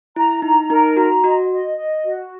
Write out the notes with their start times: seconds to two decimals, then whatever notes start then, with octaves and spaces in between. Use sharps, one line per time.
0.16 E4 A#5
0.42 D#4 A#5
0.70 D#4 A#4
0.97 F#4 A#5
1.24 F#4 D#5
1.51 D#5
1.77 D#5
2.04 F#4